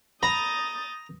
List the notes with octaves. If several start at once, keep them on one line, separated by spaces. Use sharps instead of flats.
A#5 B5 D#6 G6 A6